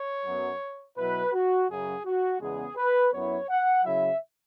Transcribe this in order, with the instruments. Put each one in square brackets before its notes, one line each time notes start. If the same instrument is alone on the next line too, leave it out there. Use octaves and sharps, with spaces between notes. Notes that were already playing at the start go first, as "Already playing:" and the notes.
Already playing: [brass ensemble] C#5
F#2 F#3 B3
B2 F#3 E4 B4
F#4
F#2 C#3 F#3 G#4
F#4
E2 C#3 G#3 B3 G#4
B4
F#2 F#3 B3 E4 C#5
F#5
C#3 F#3 E4 E5